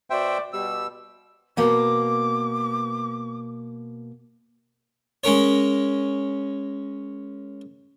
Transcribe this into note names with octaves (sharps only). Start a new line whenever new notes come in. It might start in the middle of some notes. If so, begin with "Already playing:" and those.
B2 F#4 C5 D5 E5 G5
B2 G3 E6
B2 A#3 D6
G#3 C#4 A#4 C#5